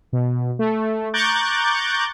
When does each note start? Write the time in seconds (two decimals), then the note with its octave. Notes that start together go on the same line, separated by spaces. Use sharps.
0.13 B2
0.59 A3
1.14 A#5 C#6 D6 F#6 G6 A6